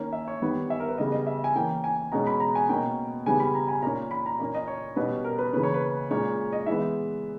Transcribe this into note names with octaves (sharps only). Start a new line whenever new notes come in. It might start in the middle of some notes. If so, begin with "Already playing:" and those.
Already playing: D#3 A#3 C#4
E5
C#5
D#3 G3 B3
E5
A#4
B4
C#3 G3 B3 D#5
D#5
E5
G#5
E3 A#3 C#4 G5
G#5
B2 G#3 C#4 A#5
B5
A#5
G#5
B2 A#3 C#4 G5
C#3 G3 B3 G#5
B5
A#5
G#5
A#2 A#3 C#4 A#5
B5
A#5
A#2 A#3 C#4
D#5
C#5
B2 G3 C#4 B4
A#4
B4
C#3 E3 A#3 C#4 B4
C#5
B4
A#2 G#3 C#4 C#5
D#5
E3 G#3 B3 E5